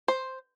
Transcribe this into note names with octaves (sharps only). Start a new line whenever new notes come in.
C5